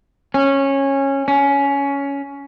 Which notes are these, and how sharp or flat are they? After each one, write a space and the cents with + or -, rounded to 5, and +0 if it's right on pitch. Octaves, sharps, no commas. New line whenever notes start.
C#4 -15
C#4 +15